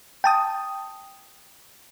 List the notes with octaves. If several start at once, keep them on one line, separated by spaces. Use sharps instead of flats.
G5 A5 D#6